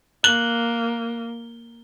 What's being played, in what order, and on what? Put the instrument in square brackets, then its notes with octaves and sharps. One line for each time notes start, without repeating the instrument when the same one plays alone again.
[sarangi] A#3 [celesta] F#6 F#7 [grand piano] G7